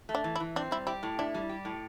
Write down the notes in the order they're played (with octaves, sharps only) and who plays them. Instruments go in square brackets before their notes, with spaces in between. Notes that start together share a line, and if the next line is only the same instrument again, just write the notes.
[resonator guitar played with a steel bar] A3
[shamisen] D4
[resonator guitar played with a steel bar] E3
[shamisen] E4
[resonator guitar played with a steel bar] E3
[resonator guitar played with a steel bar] C4 [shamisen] D4
[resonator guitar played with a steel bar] G3 [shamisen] E4
[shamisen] E4 [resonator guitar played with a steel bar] G4
[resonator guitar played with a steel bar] A2
[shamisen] D4 [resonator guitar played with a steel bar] E4
[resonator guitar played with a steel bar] G3
G4
A2